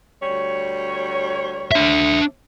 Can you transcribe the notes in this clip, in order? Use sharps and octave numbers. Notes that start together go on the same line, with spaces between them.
D2 G3 C#5
D4 E5